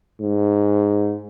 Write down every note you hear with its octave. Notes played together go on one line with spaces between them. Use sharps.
G#2